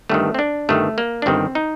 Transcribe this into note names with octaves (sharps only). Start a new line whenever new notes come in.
G1 G2 D#3 A3
C4
D4
G1 G2 D#3 A3
A#3
D4
G1 G2 D#3 C4
D#4